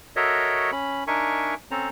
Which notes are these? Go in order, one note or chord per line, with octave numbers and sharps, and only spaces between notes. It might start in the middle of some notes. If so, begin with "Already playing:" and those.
F#4 A4 A#4 C#5 D#5 E5
C#4 B5
D4 D#4 A#4 E5 G#5 C#6
C4 C#4 A4 C5 A#5